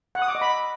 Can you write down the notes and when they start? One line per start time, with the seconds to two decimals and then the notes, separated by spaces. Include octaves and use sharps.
0.15 F#5
0.22 D#6
0.28 D6
0.35 D#5
0.41 B5